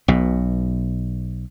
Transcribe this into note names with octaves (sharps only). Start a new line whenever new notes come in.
B1 B2